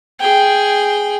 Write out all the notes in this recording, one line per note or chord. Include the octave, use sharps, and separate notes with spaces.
G#4 G5